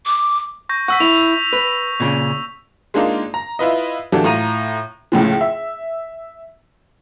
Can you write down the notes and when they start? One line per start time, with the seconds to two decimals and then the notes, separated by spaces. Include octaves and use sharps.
0.06 D6
0.69 C#6 G6 A#6
0.88 F#5 C#6 E6 B6
1.00 E4 E6 F7
1.53 B4
2.00 A#2 C#3
2.94 G#3 A#3 D4 D#4 F4
3.34 A#5
3.59 E4 F4 B4 D#5
4.12 E3 F#3 A#3 D4 G4 A4
4.24 A2 F4 A#5 D#7
5.12 C#2 A2 F3
5.41 E5